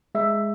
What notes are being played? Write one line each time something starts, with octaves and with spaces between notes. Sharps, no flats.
G#3 E5